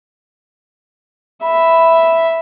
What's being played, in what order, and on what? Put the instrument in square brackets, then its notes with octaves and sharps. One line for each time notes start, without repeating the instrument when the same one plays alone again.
[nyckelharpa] E5 [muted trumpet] B5